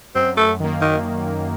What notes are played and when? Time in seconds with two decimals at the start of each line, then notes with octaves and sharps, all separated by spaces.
0.15 F#2 C4
0.37 A3
0.60 D#3 A#3
0.81 D#3